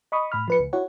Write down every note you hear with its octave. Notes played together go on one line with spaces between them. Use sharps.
D#5 B5 C#6 D#6
A2 B5 F6
F3 B4 C#7
C#2
E4 F#4 C#5 F#5